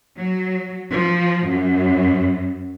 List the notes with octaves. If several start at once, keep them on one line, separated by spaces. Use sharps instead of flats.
F#3
F3
F#2